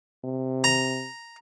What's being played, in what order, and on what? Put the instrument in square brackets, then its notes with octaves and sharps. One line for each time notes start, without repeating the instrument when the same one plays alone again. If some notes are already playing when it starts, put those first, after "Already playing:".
[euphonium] C3
[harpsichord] A#5